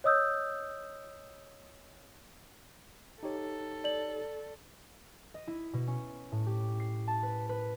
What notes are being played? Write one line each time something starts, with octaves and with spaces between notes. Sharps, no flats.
C#5 D#5 D#6 E6 G6
D#4 G4 A4 C#5
D5 F#7
D#5
E4
B2
C#4
A2
G4
C7
A5
B4
B4